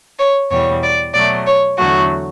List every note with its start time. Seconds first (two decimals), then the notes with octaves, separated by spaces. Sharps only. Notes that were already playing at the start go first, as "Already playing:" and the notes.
0.19 C#5
0.50 E2 B2 G3 C#5
0.82 D5
1.14 B2 F#3 A3 D5
1.46 C#5
1.78 E2 D3 F#3 A3 F#4